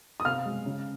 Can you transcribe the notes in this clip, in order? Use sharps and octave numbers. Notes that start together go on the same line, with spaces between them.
D#6
C3 F5 F6
G#3
C#3